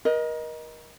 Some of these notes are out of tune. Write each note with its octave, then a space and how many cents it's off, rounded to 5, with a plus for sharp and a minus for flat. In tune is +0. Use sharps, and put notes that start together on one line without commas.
A#4 +35 D#5 +0